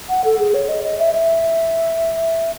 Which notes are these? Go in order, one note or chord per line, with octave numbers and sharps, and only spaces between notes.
F#5
A4
G#4
C#5
D#5
D#5
E5
E5